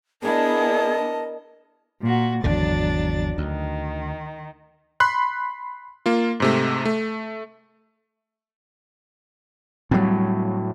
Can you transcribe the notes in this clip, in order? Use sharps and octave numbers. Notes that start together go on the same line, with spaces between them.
B3 D4 E4 G#4 A#4 D#5 A5
A#2 F#4
G#1 E2 D3 F#3 D4 A6
D2 D#3
B5 C6 F#6
A#3 F4
G#2 C3 A3
A3
A2 F#3 G3 A#3 C4